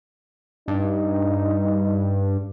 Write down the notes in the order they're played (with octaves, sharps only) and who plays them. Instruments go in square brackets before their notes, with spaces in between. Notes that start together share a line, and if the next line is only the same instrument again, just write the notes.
[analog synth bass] G2 [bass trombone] D#4